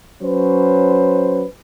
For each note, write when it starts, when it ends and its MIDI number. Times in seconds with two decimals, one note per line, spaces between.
0.23 1.45 54
0.23 1.45 61
0.23 1.45 71
0.23 1.45 72